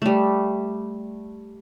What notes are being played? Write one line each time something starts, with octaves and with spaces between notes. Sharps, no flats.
G3 A3